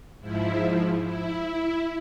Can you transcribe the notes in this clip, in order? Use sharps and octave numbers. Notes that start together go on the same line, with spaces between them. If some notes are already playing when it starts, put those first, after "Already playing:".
G#2 F3 E4
E4